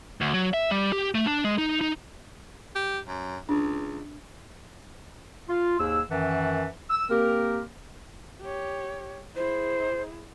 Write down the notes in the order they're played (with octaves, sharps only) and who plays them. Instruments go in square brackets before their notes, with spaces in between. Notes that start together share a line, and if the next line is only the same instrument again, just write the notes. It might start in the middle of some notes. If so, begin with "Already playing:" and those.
[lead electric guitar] D2
F#3
E5
G3
G4
A3
D4
G#3
D#4
D#4
[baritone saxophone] G4
F#2
[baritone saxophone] C#2 [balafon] D4
[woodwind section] F4
D#2 G#2 G#4 E6
F#2 D#3 E3 E5 F#5 A5
E6
A#3 C4 G4 A#4
[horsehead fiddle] G4 C#5
[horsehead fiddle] E4 G#4 [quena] C5